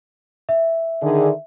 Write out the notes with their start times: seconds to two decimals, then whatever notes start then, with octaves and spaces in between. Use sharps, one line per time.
0.49 E5
1.02 D3 D#3 G#4